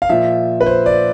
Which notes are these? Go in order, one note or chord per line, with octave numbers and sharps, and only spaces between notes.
F5
A#2 F3 E5
B4
C5
D5